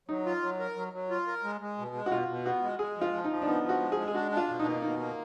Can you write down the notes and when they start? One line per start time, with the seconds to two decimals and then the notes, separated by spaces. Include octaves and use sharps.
0.09 F#3 D#4
0.26 F4
0.42 F#3
0.59 A#4
0.76 F#3
0.93 F#3
1.10 F4
1.27 A#4
1.44 G#3
1.61 G#3
1.78 B2
1.95 G#3
2.06 F#4
2.11 B2 F4
2.28 B2
2.45 B3 F#4
2.62 G#3
2.79 G#3 G#4
2.96 F3
3.01 F4
3.13 F3
3.24 D#4
3.30 F3
3.42 D4
3.47 B3 D#4
3.63 F3
3.69 F#4
3.81 G#3
3.92 G#4
3.97 G#3
4.08 G#4
4.14 D4 F#4
4.31 D4
4.37 F4
4.48 B2
4.59 D#4
4.65 A#3
4.82 B2 D#4
4.99 A#3